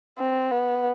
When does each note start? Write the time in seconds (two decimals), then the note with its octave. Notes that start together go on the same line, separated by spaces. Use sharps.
0.18 C4
0.51 B3